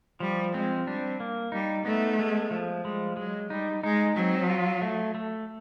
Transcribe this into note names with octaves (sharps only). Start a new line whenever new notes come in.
F3 G3
G#3 C4
G3 D4
A#3
G3 D#4
A3 B3
G#3
F3
G3 G#3
F#3 G#3
G3 D#4
G#3 D#4
F#3 C4
F4
A3
A3